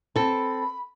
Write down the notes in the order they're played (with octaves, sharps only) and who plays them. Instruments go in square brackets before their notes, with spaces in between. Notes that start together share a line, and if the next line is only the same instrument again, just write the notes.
[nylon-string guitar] C4 A4 [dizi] B5